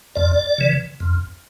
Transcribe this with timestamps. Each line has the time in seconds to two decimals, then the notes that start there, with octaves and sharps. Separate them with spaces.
0.16 F2 D5
0.58 C#3 E3
1.00 F2